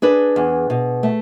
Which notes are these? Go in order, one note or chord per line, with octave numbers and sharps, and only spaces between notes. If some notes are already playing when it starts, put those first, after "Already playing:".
D4 G#4 B4
E2
B2
A3